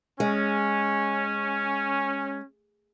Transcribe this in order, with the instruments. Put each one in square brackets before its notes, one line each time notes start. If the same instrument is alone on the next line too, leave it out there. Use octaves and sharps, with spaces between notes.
[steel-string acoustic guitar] G#3 [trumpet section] C#4